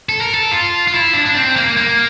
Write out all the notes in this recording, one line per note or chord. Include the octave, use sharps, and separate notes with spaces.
A4
A#4
A4
F4
F4
E4
D4
D4
C4
A#3
A#3